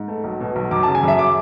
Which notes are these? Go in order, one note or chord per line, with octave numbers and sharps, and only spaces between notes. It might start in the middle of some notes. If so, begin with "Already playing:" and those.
Already playing: G#2
A3
B1
B2
B1
F#2 D6
A5
C#3
G#5
F#2 E5
D6